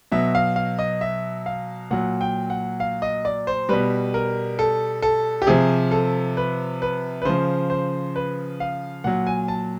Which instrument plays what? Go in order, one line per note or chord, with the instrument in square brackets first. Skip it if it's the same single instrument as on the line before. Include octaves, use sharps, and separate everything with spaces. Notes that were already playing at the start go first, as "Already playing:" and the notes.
[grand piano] B2 F#3 E5
F5
F5
D#5
E5
F5
A#2 F#3 F#5
G5
F#5
F5
D#5
D5
C5
B2 G3 B4
A#4
A4
A4
G4
C3 F3 G#4
A4
B4
B4
B4
C#3 F3 C5
C5
B4
F5
A#2 F#3 F#5
G#5
A5